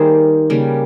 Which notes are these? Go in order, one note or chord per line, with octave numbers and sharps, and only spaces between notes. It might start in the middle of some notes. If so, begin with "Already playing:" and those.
Already playing: D#3 G3 A#3 G#4 C5
C#3 G3 A#3